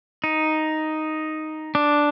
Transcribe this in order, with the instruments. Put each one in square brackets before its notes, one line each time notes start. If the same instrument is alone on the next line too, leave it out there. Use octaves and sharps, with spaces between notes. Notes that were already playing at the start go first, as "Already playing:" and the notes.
[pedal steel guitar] D#4
D4